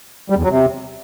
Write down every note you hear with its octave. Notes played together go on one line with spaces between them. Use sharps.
G3
E2
F#3
C3